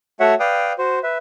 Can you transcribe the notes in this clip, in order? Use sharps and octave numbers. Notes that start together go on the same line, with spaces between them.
A3 F#4 C#5 E5 F#5
B4 D5 F5 G5 D#6
F#4 C5
B4 E5